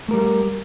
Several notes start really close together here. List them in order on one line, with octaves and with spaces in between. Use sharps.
A3 A#4 G3